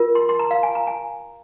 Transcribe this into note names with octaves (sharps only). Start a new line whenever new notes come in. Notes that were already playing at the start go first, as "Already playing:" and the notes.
Already playing: F4 A#4
C6
C6
A#5
F5
G#5
A#5
G#5